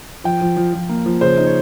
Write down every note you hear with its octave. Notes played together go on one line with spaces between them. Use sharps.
F3 G5
F3
F3
F3
A#3
F3
C#3 C5
D#4
C#5